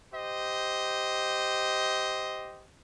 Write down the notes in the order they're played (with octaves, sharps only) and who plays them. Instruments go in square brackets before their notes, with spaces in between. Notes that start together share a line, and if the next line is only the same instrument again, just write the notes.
[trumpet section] G4 C5 D#5